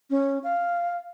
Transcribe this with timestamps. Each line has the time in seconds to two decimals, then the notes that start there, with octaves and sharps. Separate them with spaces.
0.10 C#4
0.44 F5